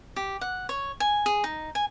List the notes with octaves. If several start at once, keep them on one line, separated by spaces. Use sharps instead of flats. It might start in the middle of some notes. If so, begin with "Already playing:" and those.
G4
F#5
C#5
G#5
G#4
D#4
G#5